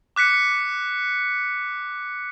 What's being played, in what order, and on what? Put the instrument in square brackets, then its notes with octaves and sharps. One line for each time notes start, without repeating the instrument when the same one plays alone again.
[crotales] D6 F#6 B6 C#7